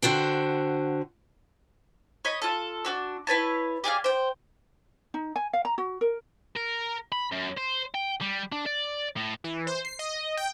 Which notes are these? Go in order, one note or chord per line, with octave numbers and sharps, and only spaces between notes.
D3 F#4 C5 G5
C#5 D#5 B5
F4 A4
D4 F#4 E6
E4 B4 C#5 A5
G4 G#4 D5 F5
C5 G5
D#4
G#5
F5
A#5
F#4
A#4
A#4
B5
F#2
C5
G5
G3
D4
D5
A2
E3
C5
C7
D#5
G5